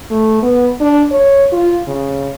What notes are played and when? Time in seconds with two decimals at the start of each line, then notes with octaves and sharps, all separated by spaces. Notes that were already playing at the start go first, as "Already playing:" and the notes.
0.11 A3
0.42 B3
0.80 D4
1.12 C#5
1.52 F4
1.88 C#3